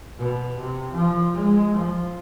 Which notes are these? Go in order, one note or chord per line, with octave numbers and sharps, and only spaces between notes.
B2
C3
F3
G#3
F3